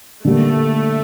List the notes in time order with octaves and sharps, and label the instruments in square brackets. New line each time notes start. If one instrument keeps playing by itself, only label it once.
[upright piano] D3 G3 A#3 [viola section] A3